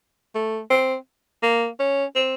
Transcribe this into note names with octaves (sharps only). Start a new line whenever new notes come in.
A3
C4
A#3
C#4
C4